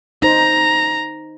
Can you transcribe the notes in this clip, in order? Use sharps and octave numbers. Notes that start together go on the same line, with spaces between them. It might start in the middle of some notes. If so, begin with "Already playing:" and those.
D#4 C5 A#5